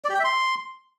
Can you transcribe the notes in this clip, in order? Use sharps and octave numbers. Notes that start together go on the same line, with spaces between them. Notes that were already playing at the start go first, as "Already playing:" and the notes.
D5
G4
G5
E5
C6